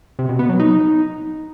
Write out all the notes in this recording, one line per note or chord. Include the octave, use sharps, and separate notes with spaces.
C3
B2
B3
F#3
D#4